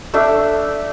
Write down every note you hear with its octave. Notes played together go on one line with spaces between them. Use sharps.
A3 D4 E5